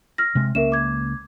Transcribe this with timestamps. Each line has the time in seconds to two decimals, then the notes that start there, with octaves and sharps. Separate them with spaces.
0.18 F6 A#6
0.35 C3 G#3
0.55 C#2 A#3 C#4 A#4 E5 E7
0.72 D6 G#6